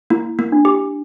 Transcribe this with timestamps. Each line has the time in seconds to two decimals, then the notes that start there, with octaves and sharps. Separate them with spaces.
0.10 A#3 E4
0.39 A#3
0.52 D4
0.65 G4